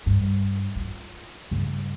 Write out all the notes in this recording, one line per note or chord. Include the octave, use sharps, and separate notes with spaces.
G2
F4
G2 C#3